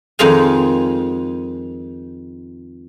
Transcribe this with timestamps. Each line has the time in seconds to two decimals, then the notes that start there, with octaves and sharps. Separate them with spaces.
0.19 F2 D#3 G#3 F5 G#5